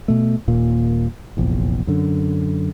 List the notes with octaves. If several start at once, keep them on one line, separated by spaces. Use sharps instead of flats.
B2 A3
D#1 A#2 A#3
F1 A#1 E2
F#2 D3